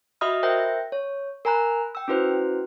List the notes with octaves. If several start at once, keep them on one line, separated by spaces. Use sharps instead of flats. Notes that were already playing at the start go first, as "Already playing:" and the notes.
F#4 D#5 E5 B5 D#6 F6
A#4 C5 E5 G5 G6 A#6
C#5
A#4 G#5 A#5 B5 F#6
G5 E6
C#4 E4 F#4 B4 C5